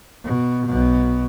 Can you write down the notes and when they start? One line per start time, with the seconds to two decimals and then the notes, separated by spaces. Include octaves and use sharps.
0.24 B2
0.66 B1 B2